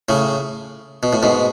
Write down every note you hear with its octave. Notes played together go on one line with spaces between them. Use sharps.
A2 C#3
B2
A2
G#2 B2